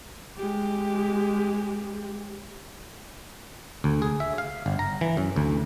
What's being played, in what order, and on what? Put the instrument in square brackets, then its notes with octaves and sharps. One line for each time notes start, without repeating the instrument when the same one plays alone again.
[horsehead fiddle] G#3 G4
[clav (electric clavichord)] D2
G#4
E5
F5
G1
A#5
E3
F#2
D2